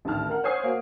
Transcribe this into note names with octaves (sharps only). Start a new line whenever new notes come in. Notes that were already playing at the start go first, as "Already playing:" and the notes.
A1 D2 D#3 A5 F6
A#4 F#5
C5 C#5 F#5 G#5 D#6 C7
A#3 F#4